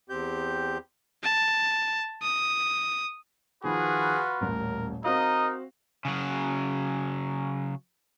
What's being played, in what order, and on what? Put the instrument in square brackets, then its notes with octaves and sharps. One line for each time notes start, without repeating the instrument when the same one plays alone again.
[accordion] E2 C4 G4 G6
[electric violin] A5
D#6
[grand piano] D#3 F3 [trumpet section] F4 F#4 B4 [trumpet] G#4
[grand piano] D#1 A1 [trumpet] A#4
[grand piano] C4 F#4 F5 [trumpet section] D#4 A#4 [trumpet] D#5
[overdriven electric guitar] C#3 F#3